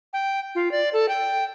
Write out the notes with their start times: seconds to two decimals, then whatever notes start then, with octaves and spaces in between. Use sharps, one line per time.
0.13 G5
0.55 F4
0.71 D5
0.93 A4
1.09 G5